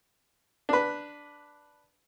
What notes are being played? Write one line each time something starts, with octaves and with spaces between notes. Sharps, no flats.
D4 B4